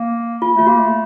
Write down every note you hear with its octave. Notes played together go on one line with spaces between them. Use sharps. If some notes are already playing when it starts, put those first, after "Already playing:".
Already playing: A#3
F4
A3 F4
A#3 F#4
A3